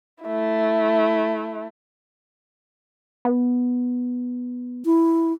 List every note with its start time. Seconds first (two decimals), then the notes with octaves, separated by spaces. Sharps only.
0.24 A3 E4
3.25 B3
4.85 E4